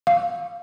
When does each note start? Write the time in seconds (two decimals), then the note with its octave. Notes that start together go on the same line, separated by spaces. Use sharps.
0.07 F5